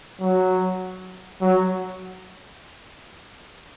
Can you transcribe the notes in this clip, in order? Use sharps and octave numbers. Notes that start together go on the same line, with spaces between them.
F#3
F#3